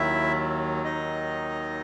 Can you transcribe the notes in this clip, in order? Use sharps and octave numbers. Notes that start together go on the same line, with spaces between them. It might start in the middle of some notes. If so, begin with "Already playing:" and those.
Already playing: D#2 D#3 F#3 E4 E5
D#4 D#5